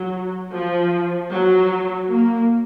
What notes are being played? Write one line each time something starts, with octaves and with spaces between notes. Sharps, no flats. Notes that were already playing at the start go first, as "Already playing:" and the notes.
Already playing: F#3
F3
F#3
A#3